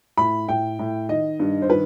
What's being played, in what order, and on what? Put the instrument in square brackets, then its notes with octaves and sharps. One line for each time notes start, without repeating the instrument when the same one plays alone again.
[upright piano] A2 B5
A2 G5
A2
D#3 D#5
G2
C5
D#3 B4